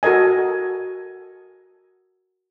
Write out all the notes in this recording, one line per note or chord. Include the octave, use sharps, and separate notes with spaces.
F#4 A4 A#4 D#5 G#5